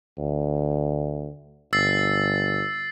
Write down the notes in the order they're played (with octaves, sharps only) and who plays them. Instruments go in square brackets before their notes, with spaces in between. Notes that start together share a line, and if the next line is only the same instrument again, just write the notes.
[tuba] D2
[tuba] G1 [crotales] E6 A6 C7